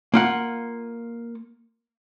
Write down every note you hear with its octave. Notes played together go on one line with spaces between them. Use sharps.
A#3 F4 F#5